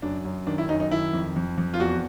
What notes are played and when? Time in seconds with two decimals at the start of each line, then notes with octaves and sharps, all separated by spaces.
0.02 F#2 D4
0.25 F#2
0.47 D#3 D4
0.58 E4
0.69 F#2 D#4
0.80 D#4
0.91 D#3 E4
1.13 F2
1.36 F2
1.58 F2
1.74 F4
1.80 E2 F#4